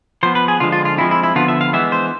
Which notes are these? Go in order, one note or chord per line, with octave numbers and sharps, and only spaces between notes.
F3 B3 C5
B4
G#4
D3 F3 G#3 F4
F4
F4
F3 G#3 C4 E4
E4
E4
D3 F3 B3 F4
E5
F5
E3 G#3 B3 E5
C5